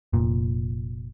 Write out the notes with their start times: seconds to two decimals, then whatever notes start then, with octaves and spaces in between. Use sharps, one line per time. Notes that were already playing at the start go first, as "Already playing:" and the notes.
0.13 F1 A#2